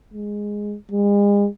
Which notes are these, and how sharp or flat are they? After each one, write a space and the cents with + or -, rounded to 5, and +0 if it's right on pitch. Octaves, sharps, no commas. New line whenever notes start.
G#3 -5
G#3 -40